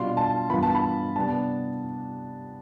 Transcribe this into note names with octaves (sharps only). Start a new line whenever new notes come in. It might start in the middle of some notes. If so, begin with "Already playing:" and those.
Already playing: B2 G3 D4 F4 C6
A5
G2 E3 B3 F4 B5
A5
B5
C3 G3 B3 D4 A5